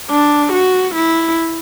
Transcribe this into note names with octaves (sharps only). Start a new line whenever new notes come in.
D4
F#4
E4